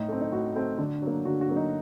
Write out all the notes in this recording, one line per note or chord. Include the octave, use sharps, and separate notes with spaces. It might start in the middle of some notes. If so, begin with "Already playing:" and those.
Already playing: A2 D#4
A3 C4
D#4
A2 F#4
A3 C4
D3
F#3 A#3
D3 F#4
F#4
F#3 A#3
D#4